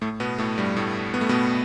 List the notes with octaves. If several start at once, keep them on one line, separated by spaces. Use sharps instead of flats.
A2 A3
B2 B3
A2 A3
G2 G3
A2 A3
B3
A3
B2 B3